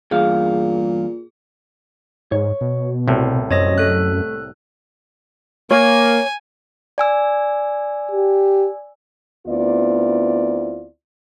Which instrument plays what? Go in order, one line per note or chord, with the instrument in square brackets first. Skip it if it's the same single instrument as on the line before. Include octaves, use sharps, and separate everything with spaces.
[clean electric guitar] E2 G2 F5 [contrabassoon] A#2 [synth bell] G#4
[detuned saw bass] G#2 [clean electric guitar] C#5
[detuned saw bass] B2
[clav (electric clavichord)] C2 A2 [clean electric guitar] C3
[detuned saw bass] F#2 [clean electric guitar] C4 [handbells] C#5 D#5 A#6
[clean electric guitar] A3 [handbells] A4 F#6
[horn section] A#3 [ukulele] C#5 [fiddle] G#5
[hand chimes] D5 G#5 E6
[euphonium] G4
[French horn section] D2 B3 C4 E4 F4 D5